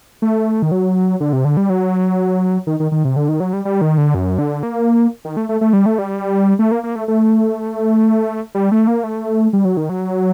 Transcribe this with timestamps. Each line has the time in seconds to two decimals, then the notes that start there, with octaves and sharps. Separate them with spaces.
0.22 A3
0.62 D#3
0.72 F#3
1.20 D3
1.33 C3
1.45 D3
1.57 G3
1.70 F#3
2.67 D#3
2.80 D#3
2.92 D#3
3.05 C3
3.16 D3
3.29 D#3
3.40 F#3
3.53 G3
3.65 G3
3.81 D#3
3.98 D3
4.15 F#2
4.39 D3
4.63 A#3
5.25 D#3
5.37 A3
5.49 A3
5.61 A3
5.73 G3
5.86 A3
5.98 G3
6.59 A3
6.72 A#3
6.83 A#3
6.95 A3
7.08 A3
8.55 G3
8.72 A3
8.87 A#3
9.04 A3
9.53 G3
9.65 F#3
9.77 D#3
9.89 F#3